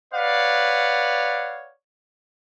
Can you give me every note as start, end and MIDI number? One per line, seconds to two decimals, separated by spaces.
0.14 1.71 71
0.14 1.71 73
0.14 1.71 74
0.14 1.71 77
0.14 1.71 78